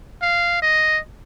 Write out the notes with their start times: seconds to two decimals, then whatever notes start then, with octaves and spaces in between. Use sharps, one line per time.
0.22 F5
0.62 D#5